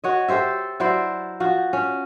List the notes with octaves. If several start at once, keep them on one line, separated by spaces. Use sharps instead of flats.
F#4 C#5 D#5
G4 A4 C5 E5
F#3 E4 C5 D5
F3 F#4
C#4